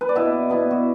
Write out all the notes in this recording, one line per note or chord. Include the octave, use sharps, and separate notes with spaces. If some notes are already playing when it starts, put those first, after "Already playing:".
B4
D5
B2 B3 E4 E5
B2 B3 E4
F#4